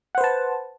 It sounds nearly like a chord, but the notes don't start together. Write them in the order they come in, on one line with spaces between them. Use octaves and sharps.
F#5 C5 B4 A5